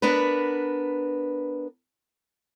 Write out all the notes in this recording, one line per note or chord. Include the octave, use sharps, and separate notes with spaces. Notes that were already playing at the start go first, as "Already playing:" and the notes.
B3 D4 A#4 B4